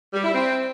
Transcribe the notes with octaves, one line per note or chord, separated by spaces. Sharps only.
G3
E4
C4